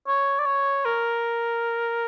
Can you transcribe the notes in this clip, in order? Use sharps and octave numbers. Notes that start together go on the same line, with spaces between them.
C#5
D5
C#5
A#4